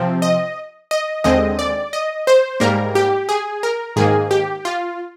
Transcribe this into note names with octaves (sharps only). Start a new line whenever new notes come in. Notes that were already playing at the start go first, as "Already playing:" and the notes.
Already playing: C3 F3 C4
D#5
D#5
D#2 D3 G#3 C4 D#5
D5
D#5
C5
G#2 G3 A#3 A#4
G4
G#4
A#4
G#2 D#3 A#3 G#4
G4
F4